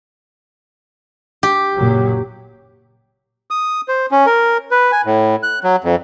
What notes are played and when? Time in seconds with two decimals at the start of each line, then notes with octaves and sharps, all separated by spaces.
1.43 G4
1.76 F#1 A#2 F#3
3.51 D#6
3.88 C5
4.11 C#4
4.26 A#4
4.71 B4
4.92 G#5
5.05 A2
5.43 F#6
5.64 F#3
5.84 F2